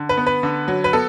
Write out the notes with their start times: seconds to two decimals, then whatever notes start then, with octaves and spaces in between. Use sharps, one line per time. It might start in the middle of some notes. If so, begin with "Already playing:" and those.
Already playing: D3
0.09 B4
0.17 B3
0.27 B4
0.43 D3
0.68 F#3
0.84 B4
0.93 B3 A4